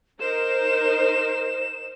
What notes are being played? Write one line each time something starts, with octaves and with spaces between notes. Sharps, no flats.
D#4 A#4 C5 E7